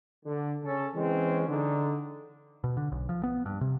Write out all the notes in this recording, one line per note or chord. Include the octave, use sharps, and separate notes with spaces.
D3
C#3 C#4 A4
E3 G#3 C4 C#4
D3 D#4
B2
D3
B1
F3
B3
G2
C3